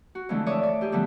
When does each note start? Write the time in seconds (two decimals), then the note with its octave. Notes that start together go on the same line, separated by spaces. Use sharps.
0.15 F#4
0.29 F2 D3 E3 G#3 A3 D4
0.46 A4 C#5 D5 E5 C#6 D#6
0.63 D5
0.81 G#2 G4 G#4
0.92 D3 F3 G3 A3 B3